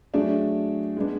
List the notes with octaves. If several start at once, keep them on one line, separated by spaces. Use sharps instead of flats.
F#3 A3 D4 G#4 D5
G#3 B3 D4